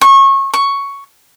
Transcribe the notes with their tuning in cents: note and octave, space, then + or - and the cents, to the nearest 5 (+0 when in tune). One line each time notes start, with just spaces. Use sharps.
C#6 -25
C#6 +5